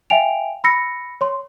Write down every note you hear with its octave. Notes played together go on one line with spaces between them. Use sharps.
E5 F5 G5 G#5 D7 F7
B5 E6 A#6 C#7
C#5 C6